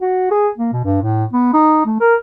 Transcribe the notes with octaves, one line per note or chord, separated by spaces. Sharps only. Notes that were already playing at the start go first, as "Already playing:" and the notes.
F#4
G#4
A#3
B2
G2
A2
B3
D#4
A3
A#4